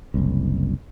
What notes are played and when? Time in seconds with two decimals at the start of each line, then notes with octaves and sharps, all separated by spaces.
0.14 F#1 C2